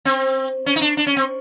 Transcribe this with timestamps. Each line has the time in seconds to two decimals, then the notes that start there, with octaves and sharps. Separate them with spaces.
0.05 C4
0.66 C#4
0.76 D#4
0.81 D4
0.97 D4
1.06 C#4
1.16 C4